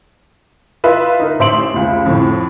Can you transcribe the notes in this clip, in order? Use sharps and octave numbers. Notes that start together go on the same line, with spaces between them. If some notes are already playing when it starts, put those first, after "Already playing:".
F4 B4 D#5 E5
D#4 A#4
A1 C5 E5 C6 D7 F#7
F1 C#2
F2 A2